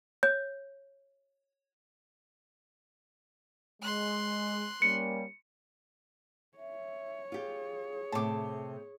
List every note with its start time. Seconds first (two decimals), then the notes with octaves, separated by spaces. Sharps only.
0.23 C#5 G6
3.82 G#3 C6 F#6
4.82 G3 A#3 C#4 C#7
6.58 C#5 E5
7.32 F4 G4 G#4
8.12 A2 C3 A5 D6